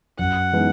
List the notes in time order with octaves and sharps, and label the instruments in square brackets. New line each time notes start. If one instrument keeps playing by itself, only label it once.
[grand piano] F#2 [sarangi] F#5
[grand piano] E3 G#3 B3 D#4